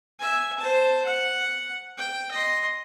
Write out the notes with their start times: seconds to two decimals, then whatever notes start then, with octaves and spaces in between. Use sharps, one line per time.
0.19 E5 G#5
0.58 C5 A5
1.05 F#5
1.98 G5
2.31 D#5 C6